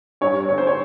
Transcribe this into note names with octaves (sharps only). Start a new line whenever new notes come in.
G2 C#5
G1 C#5
C5
C#5